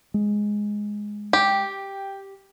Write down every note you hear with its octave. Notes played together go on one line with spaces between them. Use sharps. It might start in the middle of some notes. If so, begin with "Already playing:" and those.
G#3
G4 G5